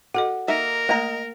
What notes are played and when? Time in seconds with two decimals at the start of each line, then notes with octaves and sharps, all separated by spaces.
0.14 F#4 A4 D#5 F#5
0.48 A#3 D#4 A#4 E5
0.89 A3 A#3 D#5 A#5